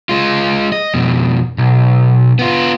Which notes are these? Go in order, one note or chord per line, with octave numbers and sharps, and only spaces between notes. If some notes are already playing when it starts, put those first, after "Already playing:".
G#3 F4
D#5
F2 B2
B1
B3 F4